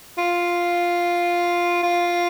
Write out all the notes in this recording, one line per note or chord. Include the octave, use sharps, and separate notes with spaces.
F4
F4